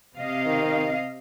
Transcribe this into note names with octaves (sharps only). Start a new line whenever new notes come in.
C3 D#5 F5
D#3